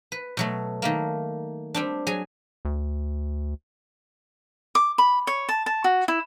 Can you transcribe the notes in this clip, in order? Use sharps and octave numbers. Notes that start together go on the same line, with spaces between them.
B4
B2 F#3 A3
D#3 A3 A#3
G3 C4 D4
F#3 G#4 G#5
D2
D6
B5
C#5
A5
A5
F#4
E4